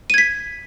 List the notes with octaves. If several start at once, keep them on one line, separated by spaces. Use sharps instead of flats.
G#6 B6 D#7